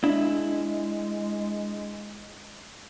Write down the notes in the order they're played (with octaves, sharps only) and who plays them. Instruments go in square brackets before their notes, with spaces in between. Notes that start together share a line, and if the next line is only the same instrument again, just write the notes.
[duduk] G#3 [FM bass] D4 [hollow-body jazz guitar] E4